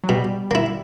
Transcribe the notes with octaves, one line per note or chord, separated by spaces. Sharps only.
F#3
B2 G3
A#3 E4